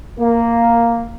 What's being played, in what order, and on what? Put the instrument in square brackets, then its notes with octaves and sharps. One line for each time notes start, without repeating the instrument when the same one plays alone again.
[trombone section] A#3